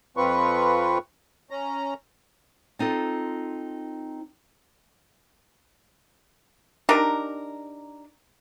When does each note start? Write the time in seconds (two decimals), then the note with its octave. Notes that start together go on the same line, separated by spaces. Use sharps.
0.17 F2 F3 C4 F4 B4 C#6
1.50 C#4 A#5
2.79 C4 D#4 F4 A4
6.89 D4 D#4 G4 A#4